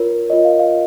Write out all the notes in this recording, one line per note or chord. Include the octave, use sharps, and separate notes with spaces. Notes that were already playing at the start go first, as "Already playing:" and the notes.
Already playing: F4 A#4 C#5
F4 A#4 C#5 D#5
F5
F5